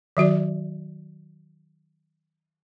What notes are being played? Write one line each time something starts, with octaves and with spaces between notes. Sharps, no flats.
D#3 F#3 F#4 D5